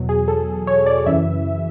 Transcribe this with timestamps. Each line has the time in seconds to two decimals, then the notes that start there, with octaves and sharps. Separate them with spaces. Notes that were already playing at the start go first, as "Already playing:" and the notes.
Already playing: E2 B2 F#3
0.09 G#4
0.28 A4
0.67 C#5
0.86 D5
1.06 F#2 C#3 E3 E5